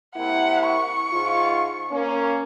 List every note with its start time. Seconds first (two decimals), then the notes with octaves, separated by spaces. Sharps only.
0.16 C3 A#3 E4 F#5
0.67 C#6
1.13 G#2 F4
1.91 A#3 C#4